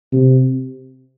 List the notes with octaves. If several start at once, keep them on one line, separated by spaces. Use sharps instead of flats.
C3